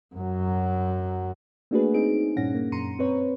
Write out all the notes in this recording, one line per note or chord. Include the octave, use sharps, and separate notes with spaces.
F#2 F#3
A3 A#3 D4 F#4 G#4 B4
C4 D#4 G#4 D7
G2 A#2 C#4 F#5 A#6
A#3
F#2 A#2 A#5 C6 C#7 D#7
C4 B4 C#5